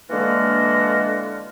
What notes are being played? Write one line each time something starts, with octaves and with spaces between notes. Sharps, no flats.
D3 E3 G#3 A#3 F4 F#4